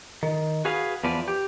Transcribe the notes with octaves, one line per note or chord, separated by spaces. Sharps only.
D#3
F#4 G#4 B4 F5
E2 F3 B4 D5
G4